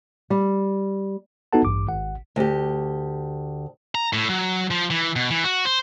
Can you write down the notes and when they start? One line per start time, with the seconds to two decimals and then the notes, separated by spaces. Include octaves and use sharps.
0.30 G3
1.53 B3 D#4 F#4 A4 F#5 A5
1.65 A1 G2 D6
1.88 G#1 F#5
2.36 D2 G4
3.95 A#5
4.13 A2
4.29 F#3
4.71 F3
4.90 E3
5.16 B2
5.30 E3
5.44 F#4
5.65 C5